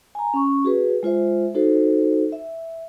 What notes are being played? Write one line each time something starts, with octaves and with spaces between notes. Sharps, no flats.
G#5 A#5
C#4 C#6
F#4 G#4 B4
G#3 F4 C5 E5
D#4 F#4 A4 C5
E5